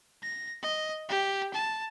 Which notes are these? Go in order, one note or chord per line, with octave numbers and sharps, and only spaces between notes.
A#6
D#5
G4
A5